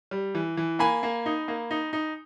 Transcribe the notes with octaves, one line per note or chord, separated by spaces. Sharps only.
G3
E3
E3
A#3 G#5 B5
A#3
D#4
A#3
D#4
D#4